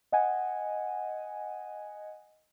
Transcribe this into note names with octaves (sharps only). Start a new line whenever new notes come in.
D#5 F#5 G#5